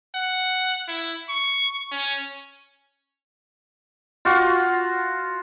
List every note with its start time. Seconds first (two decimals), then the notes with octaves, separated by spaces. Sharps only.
0.15 F#5
0.88 E4
1.29 C#6
1.92 C#4
4.25 F4 F#4